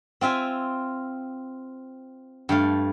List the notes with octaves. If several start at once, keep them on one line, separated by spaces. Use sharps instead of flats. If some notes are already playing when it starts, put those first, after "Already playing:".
C4 F4 E5 G#5
G2 A3 F5